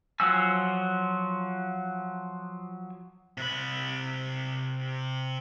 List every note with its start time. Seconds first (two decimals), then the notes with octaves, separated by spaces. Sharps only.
0.20 F3 F#3 F#4 G#5 E6
3.38 C3 B5